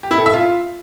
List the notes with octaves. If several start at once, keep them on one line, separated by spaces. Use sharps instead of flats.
G4
E4
A4
E5
F4